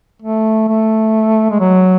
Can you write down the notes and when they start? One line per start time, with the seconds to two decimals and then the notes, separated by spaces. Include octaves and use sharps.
0.22 A3
0.69 A3
1.51 G#3
1.60 F#3